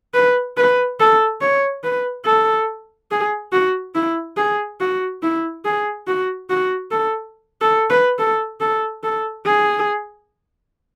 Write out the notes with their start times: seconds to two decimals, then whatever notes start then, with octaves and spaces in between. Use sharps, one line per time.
0.14 B4
0.57 B4
1.00 A4
1.41 C#5
1.84 B4
2.25 A4
3.11 G#4
3.52 F#4
3.95 E4
4.37 G#4
4.81 F#4
5.22 E4
5.65 G#4
6.07 F#4
6.50 F#4
6.91 A4
7.61 A4
7.90 B4
8.19 A4
8.61 A4
9.03 A4
9.46 G#4